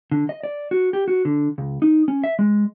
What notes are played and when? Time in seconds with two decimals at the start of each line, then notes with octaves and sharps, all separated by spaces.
0.12 D3
0.29 D#5
0.44 D5
0.71 F#4
0.93 G4
1.08 F#4
1.25 D3
1.58 C#2
1.82 D#4
2.08 C#4
2.24 E5
2.39 G#3